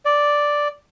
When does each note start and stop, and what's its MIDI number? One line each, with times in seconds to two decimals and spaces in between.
0.05 0.68 74